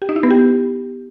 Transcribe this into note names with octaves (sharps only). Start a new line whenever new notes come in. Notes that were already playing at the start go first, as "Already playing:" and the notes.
G4
D#4
E4
B3
G4